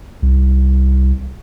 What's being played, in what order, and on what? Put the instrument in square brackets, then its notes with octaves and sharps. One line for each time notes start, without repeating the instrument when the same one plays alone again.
[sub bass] C2